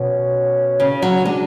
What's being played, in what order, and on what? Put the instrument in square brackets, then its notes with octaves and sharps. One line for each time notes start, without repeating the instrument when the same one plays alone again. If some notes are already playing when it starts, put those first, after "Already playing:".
Already playing: [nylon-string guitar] B2 [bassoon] C#4
[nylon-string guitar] C#3
F#3
[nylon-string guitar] G#3 [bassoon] D4